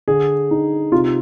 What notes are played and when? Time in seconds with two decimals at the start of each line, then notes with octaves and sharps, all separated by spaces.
0.08 D3 G#4
0.51 D#4
0.92 C3 F4